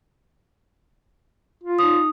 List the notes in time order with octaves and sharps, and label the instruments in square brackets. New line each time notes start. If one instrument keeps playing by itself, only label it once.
[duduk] F4
[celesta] D#4 D#6